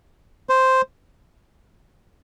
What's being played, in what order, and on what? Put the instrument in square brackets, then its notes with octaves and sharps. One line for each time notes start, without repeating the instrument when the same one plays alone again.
[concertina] C5